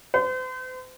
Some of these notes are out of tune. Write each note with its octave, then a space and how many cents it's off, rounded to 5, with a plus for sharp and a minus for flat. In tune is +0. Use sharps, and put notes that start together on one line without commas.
C5 -40